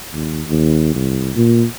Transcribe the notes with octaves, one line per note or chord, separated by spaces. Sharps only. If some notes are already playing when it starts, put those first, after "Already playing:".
D#2
D#2
C2
A#2